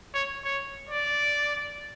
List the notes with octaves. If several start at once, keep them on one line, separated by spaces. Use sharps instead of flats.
C#5
C#5
D5